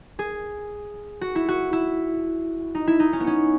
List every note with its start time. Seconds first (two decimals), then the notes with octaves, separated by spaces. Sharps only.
0.19 G#4
1.21 F#4
1.35 E4
1.48 F#4
1.73 E4
2.75 D#4
2.87 E4
3.00 D#4
3.13 C#4
3.20 B3
3.27 C#4